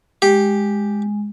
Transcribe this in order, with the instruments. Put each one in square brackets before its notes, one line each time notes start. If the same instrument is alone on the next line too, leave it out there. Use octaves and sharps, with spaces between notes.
[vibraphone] G#3 [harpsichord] G4